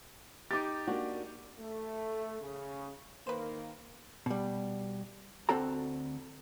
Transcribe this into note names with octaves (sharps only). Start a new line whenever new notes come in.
D#4 G4 D6 A6
A#3 D4 F#4
A3
C#3
D#3 A#3 B4 C5
B2 G3
D2 C4 F#4 A4 A#5